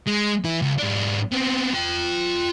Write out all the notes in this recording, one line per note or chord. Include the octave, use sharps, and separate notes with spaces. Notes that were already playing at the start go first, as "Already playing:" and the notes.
G#3
E3 E4
C#2
G#2 D4
B3 C4
F4 G5